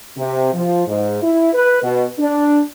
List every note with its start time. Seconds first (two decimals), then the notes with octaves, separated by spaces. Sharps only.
0.18 C3
0.54 F3
0.88 G#2
1.22 E4
1.54 B4
1.83 B2
2.19 D4